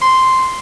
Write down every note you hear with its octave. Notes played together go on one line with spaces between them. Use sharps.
C6